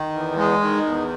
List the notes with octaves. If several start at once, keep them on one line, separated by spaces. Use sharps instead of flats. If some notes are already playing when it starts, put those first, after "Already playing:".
Already playing: D#3
E2
G#3
D#3
E2